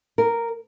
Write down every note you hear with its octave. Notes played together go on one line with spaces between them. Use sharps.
A#4